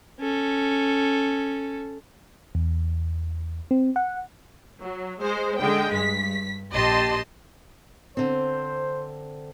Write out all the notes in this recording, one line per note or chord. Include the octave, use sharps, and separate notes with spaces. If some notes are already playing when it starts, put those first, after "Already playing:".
C#4 A4
E2
C4
F#5
F#3
G#3 C5
D3 G#3 G5
G2 B6
A#1 G4 D#5 A5 C6
D3 C4 C5